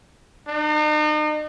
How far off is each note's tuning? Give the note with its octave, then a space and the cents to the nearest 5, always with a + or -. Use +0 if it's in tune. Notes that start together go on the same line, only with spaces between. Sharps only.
D#4 -40